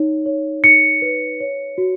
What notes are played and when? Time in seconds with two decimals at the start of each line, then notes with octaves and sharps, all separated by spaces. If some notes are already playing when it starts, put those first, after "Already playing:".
Already playing: D#4 C#5
0.26 C#5
0.63 D#4 C#7
1.02 B4
1.40 C#5
1.78 F#4